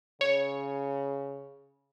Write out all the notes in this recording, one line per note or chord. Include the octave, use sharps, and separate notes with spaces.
C#3 C#5